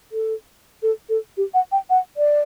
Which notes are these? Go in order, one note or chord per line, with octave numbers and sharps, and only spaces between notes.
A4
A4
A4
G4
F#5
G5
F#5
D5